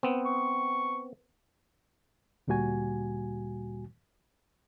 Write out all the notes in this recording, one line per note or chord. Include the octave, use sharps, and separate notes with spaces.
B3 C4
C#6
D2 A#2 G3 F#4 G#5